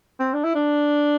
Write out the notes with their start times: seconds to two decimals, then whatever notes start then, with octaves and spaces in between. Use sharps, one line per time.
0.20 C4
0.34 D4
0.44 E4
0.55 D4